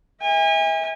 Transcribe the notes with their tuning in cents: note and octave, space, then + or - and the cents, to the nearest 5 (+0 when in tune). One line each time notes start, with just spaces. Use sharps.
E5 -35 G#5 -35